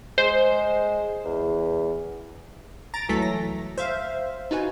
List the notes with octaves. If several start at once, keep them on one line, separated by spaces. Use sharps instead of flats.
G#3 C5
E2
A#5 A6 A#6 D7
C#2 E3 F#3 A3 A4 B6
A#6
C5 E5 F5
D#4 F4 F#4 B4 G#5